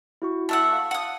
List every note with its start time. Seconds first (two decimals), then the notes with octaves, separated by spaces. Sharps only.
0.22 E4 F#4 C#6
0.49 A3 E5 F#5
0.71 F5 A5
0.91 F#5 D#6